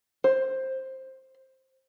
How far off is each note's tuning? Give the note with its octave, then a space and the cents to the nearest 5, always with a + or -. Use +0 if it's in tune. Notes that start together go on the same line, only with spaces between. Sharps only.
C5 +10